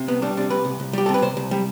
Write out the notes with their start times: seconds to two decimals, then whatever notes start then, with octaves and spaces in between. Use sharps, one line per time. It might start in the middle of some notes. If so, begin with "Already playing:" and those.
Already playing: C3
0.08 C2 B3
0.22 G3 D4
0.37 C3 D4
0.50 C2 B4
0.65 C2
0.80 C2
0.93 G3 G4
1.06 A4
1.09 C3
1.14 B4
1.22 C3 C5
1.37 C2
1.51 G3